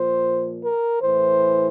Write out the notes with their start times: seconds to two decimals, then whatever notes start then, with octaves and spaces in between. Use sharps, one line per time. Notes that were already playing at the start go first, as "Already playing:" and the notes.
Already playing: A#2 F3 C5
0.63 A#4
1.01 A2 E3 C5